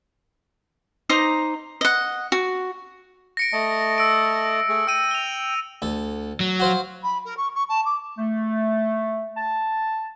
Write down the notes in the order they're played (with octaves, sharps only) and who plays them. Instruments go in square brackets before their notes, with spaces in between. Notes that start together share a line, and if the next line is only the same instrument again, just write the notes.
[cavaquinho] D#4 C5 A#5 D6
D#5 F#5
F#4
[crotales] A#6 C#7 D7
[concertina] A3 D#5 A5
[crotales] E6 D7
[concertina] A3 G#4
[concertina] G5 [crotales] E6 D#7
[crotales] F7 G7
[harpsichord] D2 A4
[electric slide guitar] F#3
[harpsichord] F#4 C5 F5
[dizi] B5
A#4
C#6
C#6
A5
D6
[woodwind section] A3
A5